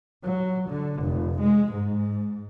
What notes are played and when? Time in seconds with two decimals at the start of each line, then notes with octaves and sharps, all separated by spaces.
0.23 F#3
0.68 D3
1.00 F1
1.40 G#3
1.72 G#2